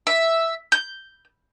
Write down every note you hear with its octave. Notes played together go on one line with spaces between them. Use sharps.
E5
G6